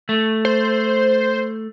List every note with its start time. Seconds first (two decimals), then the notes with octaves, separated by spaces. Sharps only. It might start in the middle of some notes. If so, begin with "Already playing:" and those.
0.09 A3
0.45 C5